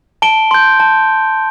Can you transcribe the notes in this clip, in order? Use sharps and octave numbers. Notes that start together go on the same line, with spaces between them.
A5 D7 G7
C6 G6
A5